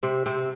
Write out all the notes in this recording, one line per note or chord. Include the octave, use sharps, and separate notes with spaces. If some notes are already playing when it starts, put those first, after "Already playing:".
C3 C4
C3 C4